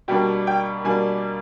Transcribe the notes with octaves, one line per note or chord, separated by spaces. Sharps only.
B2 G3 A#3 D4 G5
G5
B2 G3 A#3 D4 G#5